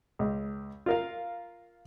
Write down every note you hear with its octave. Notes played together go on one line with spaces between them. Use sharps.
C#2
F4 A#4 F5